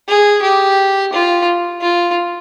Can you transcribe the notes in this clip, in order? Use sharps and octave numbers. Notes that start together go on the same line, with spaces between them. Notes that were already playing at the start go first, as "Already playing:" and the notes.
G#4
G4
F4
F4